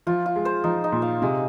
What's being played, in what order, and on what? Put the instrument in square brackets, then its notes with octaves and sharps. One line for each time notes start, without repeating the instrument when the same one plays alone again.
[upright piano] F3 [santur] F4
[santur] F4
[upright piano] G#3
[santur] C5
[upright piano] F3 [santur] D#4
[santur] D#4
[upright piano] A#2
[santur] F5
[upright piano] C3 [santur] G#3